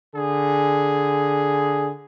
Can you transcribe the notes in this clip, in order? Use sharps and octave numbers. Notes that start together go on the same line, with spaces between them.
D3 G#4